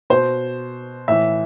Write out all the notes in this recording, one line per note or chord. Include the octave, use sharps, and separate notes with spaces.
B2 C5
A2 E3 E5